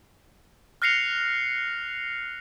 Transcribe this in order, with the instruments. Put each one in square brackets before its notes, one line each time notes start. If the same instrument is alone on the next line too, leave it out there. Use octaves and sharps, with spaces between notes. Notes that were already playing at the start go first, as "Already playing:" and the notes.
[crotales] F6 F#6 A#6 C7 C#7 F7